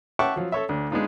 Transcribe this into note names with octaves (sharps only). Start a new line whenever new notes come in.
E5 F#5 G5 A5 C#6 D6
F3 F#3
A4 C#5 E5
D2 D4
G#3 B3 D4 D#4 F4